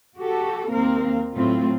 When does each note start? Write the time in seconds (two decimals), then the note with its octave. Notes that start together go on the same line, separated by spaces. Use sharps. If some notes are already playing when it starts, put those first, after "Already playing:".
0.19 F#4 G4 A4
0.71 D#2 A#3 C4 A#4 F5
1.34 A2 F#3 C4 F4